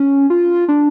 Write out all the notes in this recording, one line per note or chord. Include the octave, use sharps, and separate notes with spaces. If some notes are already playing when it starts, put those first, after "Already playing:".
Already playing: C#4
F4
D4